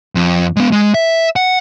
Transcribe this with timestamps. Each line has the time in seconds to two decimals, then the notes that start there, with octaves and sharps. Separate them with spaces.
0.15 F2
0.57 G#3 B3
0.72 G#3
0.94 E5
1.36 F#5